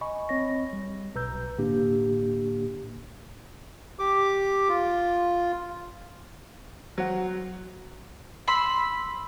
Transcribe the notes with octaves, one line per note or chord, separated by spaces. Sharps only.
D#5 G#5 B5 C#6
C4 C#5 D#5 A#6
G3
B1 B2 B4 A#5 E6 G6
A2 D3 A#3 D4 G4
G4 D6
F4
F#3 C5 F#5
B5 C6 E6